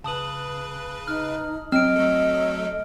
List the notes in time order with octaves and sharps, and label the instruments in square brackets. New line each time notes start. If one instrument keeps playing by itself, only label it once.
[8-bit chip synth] C#3 B4 [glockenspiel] A5 D#6 F#7
[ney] D#4 [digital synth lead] F6
[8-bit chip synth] F#3 [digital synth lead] C4 [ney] D#5 [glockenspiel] F6 D7
[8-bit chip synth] F#3 A3 A4